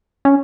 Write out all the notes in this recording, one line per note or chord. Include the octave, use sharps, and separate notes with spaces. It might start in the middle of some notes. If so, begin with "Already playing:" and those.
C#4